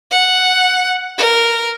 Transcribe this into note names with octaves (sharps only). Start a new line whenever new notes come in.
F#5
A#4